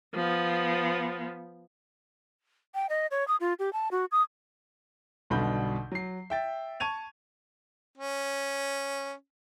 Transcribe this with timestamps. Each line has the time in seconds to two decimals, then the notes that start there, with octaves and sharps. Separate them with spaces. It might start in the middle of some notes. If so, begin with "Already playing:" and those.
0.14 F3 B3
2.75 G5
2.89 D#5
3.11 C#5
3.28 D#6
3.40 F4
3.59 G4
3.73 A5
3.91 F#4
4.12 D#6
5.30 B1 G2 B2 D3 B5 G6
5.92 F#3 C7
6.30 E5 G5 A6
6.80 A5 C#6 G#6 D#7 F7
7.98 C#4